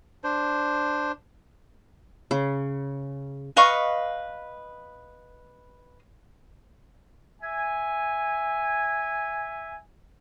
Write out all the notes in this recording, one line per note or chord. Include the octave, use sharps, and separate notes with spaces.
D4 C5
C#3
B4 D#5 F5 C#6
E5 G#5